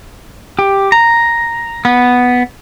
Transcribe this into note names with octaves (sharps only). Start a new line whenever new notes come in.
G4
A#5
B3